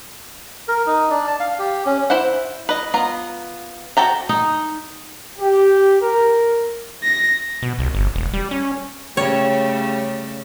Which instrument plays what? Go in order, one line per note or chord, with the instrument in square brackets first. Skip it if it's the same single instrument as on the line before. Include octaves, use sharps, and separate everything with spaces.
[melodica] A#4
D#4
D4
A5
F5
G4
C#4
[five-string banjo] E4 C5 F#5
B4 D#5
B3 F4 A#5
F#4 A4 G5 A#5
[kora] D#4
[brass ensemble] G4
A#4
[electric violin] A#6
[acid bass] B2
C2
G1
E1
G3
C#4
[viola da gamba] C#3 A3 [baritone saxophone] G3 [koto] C#5